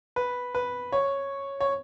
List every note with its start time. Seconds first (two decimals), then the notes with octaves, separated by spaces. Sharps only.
0.16 B4
0.55 B4
0.92 C#5
1.60 C#5